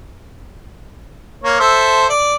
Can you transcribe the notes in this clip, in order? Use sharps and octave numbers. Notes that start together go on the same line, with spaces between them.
A#3 C#5
A4 C5 E5
D5